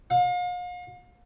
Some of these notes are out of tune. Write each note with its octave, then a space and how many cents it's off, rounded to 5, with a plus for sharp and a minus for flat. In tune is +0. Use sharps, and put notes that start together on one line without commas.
F5 +40